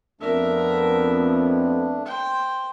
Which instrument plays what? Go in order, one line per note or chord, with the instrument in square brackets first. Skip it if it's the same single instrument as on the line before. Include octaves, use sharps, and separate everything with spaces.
[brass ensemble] F2 B3 [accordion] A3 D4 [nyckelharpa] A#4 E5
[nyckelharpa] C5 G5